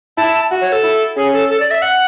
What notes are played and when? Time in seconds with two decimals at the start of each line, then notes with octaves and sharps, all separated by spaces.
0.17 E4 A5
0.51 F#4
0.61 C#5
0.72 A4
0.83 E4
1.16 C#4 G#4
1.33 A4
1.49 A4
1.60 D5
1.71 E5
1.82 F#5